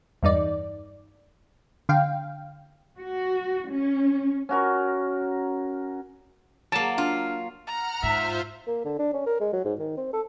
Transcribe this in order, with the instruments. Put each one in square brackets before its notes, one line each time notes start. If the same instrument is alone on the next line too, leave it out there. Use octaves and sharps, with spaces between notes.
[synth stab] E2 G2 D#4 D5
D3 F5 G5
[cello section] F#4
C#4
[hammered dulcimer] C#4 F#4 A#4
[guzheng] F#3 A#3 [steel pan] A5
[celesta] D4 F6 [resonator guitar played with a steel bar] F4
[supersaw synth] F#5 F6 [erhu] A#5
[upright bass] G#2 [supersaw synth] F4 C5 [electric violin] E5
[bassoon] A#3
D3
D4
C#4
A#4
G#3
F#3
G#2
D#3
C4
A4